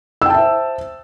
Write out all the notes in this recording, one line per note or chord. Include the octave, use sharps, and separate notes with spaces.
C5 E5 G5 A5 E6